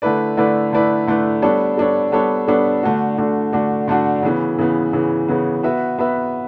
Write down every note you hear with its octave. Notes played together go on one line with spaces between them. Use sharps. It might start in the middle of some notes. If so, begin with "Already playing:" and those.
D3 A3 E4 B4 D5
D3 A3 E4 B4 D5
D3 A3 E4 B4 D5
D3 A3 E4 B4 D5
G3 B3 D4 A4 C#5
G3 B3 D4 A4 C#5
G3 B3 D4 A4 C#5
G3 B3 D4 A4 C#5
D3 A3 D4 F#4
D3 A3 D4 F#4
D3 A3 D4 F#4
D3 A3 D4 F#4
C#3 E3 B3
C#3 E3 B3
C#3 E3 B3
C#3 E3 B3
B3 F#4 B4 E5
B3 F#4 B4 E5